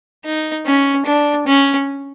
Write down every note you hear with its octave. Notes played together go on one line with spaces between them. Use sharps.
D#4
C#4
D4
C#4